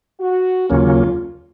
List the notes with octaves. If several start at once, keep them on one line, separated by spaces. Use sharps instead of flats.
F#4
D#2 C#3 F#3 A#3 C#4 F4